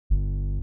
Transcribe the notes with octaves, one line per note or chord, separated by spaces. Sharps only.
G1